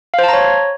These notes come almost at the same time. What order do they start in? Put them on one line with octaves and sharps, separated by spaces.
F5 C5 A5 A#5 C#5